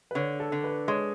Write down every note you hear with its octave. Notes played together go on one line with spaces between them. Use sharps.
B4
D3 C#5
A4
D3
B4
G#3 C#5